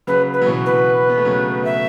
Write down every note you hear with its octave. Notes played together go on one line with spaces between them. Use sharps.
C#3 F#3 B4
B4
F#3
B2 E3
B4
B3
A3
C#3 F#3
E5